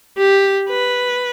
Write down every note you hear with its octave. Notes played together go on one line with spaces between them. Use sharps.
G4
B4